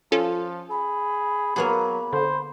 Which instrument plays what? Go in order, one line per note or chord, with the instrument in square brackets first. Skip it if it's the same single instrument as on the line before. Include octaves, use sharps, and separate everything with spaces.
[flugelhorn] F3 [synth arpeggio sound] C#4 F4 A4
[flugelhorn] G#4 [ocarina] B5
[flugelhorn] F#3 [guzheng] A#3 B3 G#4
[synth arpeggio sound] D3 [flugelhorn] C5